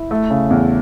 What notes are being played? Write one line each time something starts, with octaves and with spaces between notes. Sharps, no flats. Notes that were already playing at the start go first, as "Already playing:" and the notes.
Already playing: E4
A3
C#3
E2